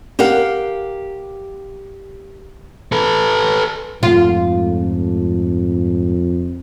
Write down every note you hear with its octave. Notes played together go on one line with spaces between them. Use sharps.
G4 A#4 F5 F#5
A4 B4
F2 G#2 A3 F4